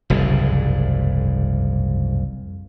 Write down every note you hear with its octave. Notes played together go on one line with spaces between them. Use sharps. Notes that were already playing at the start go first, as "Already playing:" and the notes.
F#1 C2 F2 G#2